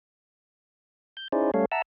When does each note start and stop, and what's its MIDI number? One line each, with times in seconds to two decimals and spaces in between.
1.17 1.28 91
1.32 1.51 61
1.32 1.51 63
1.32 1.51 64
1.32 1.51 68
1.32 1.51 72
1.32 1.51 74
1.54 1.65 55
1.54 1.65 57
1.54 1.65 61
1.54 1.65 69
1.54 1.65 73
1.54 1.65 77
1.72 1.82 76
1.72 1.82 78
1.72 1.82 81
1.72 1.82 82
1.72 1.82 88